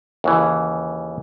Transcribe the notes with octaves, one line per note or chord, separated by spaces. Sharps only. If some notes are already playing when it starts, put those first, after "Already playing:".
D#2 C#3 E3